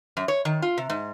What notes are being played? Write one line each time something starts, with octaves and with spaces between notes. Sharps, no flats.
F#2
C#5
D#3
F4
C3
G#2